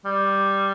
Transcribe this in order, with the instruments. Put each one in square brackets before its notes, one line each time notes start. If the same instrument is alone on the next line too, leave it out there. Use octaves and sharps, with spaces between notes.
[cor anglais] G3